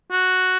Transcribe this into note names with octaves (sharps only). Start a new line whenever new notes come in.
F#4